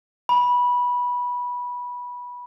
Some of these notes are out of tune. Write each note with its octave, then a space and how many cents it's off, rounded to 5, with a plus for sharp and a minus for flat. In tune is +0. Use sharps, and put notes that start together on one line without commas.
B5 -15